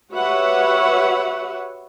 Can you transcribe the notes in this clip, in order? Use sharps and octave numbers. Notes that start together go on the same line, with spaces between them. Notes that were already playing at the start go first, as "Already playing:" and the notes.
F#4 G4 B4 C#5 E5 F#5